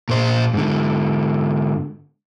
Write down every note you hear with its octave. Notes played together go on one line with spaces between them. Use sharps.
A#2 C5
G#2 D3